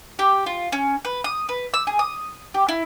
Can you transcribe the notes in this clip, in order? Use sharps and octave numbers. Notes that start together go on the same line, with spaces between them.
G4
F4
C#4
B4
D#6
B4
E6
G#4
D#6
G4
E4